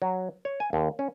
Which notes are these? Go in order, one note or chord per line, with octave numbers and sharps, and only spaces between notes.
F#3
C#5
G#5
D#2
C#4